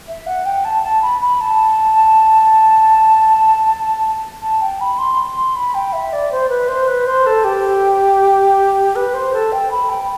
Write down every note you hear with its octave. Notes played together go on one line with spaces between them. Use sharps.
E5
F#5
G5
A5
A5
B5
B5
A5
A5
G5
B5
C6
C6
B5
G5
E5
D5
C5
B4
C5
B4
C5
A4
G4
B4
C5
A4
G5
B5
G5